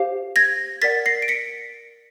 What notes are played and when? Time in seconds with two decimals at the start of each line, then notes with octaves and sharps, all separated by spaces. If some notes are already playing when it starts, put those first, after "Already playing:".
Already playing: G4 C5 F5
0.36 G#6 A#6
0.82 A#4 D5 F#5 A6 B6
1.06 A#6 C7
1.22 D7
1.28 B6 C#7